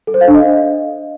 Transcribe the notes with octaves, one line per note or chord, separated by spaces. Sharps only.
A4
C5
F5
D4
D#5